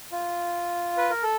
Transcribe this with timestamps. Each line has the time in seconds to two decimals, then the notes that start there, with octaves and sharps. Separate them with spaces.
0.12 F4
0.98 B4
1.10 A#4
1.23 A4